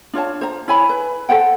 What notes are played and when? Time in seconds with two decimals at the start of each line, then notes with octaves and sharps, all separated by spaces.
0.13 D4 F4 C#5 A5
0.41 C5 A#5
0.68 E4 C#5 G#5 B5
0.89 B4
1.29 A4 C5 F#5 G5